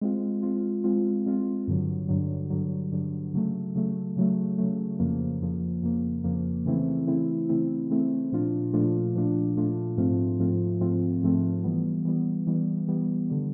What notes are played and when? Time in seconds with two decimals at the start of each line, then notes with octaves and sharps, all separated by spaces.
0.01 G#3 C4 F4
0.43 G#3 C4 F4
0.84 G#3 C4 F4
1.26 G#3 C4 F4
1.67 G2 D3 F#3
2.09 G2 D3 F#3
2.50 G2 D3 F#3
2.92 G2 D3 F#3
3.34 C#3 F#3 A3
3.75 C#3 F#3 A3
4.16 C#3 F#3 A3
4.58 C#3 F#3 A3
4.99 F2 C#3 F3 A#3
5.41 F2 C#3 F3 A#3
5.82 F2 C#3 F3 A#3
6.24 F2 C#3 F3 A#3
6.65 C#3 E3 A3 C4 E4
7.07 C#3 E3 A3 C4 E4
7.49 C#3 E3 A3 C4 E4
7.90 C#3 E3 A3 C4 E4
8.32 A#2 F3 A3 D4 F4
8.73 A#2 F3 A3 D4 F4
9.15 A#2 F3 A3 D4 F4
9.56 A#2 F3 A3 D4 F4
9.97 G#2 F3 A3 C4 F4
10.39 G#2 F3 A3 C4 F4
10.80 G#2 F3 A3 C4 F4
11.22 G#2 F3 A3 C4 F4
11.64 E3 G3 B3
12.05 E3 G3 B3
12.47 E3 G3 B3
12.88 E3 G3 B3
13.30 D3 G3